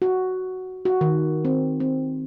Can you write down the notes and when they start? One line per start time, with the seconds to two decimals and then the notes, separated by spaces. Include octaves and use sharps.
0.02 F#4
0.85 F#4
1.01 D#3
1.45 C4
1.80 C4